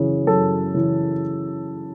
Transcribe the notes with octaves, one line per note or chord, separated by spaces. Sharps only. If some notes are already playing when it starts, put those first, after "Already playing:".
Already playing: F#2 C#3 E3
F#2 A4
C#3 E3